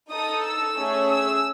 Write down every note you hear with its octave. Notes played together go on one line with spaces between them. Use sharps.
D#4 A4 D#6
E6
A3 C#4 G#4
E6